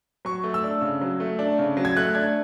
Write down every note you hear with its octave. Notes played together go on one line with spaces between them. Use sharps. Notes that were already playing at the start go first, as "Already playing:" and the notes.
F#3 C#6
A3
E6
D4
C#3
F#3
A3
D4
C#3
F#3
G#6
A3 F#6
D4 G#6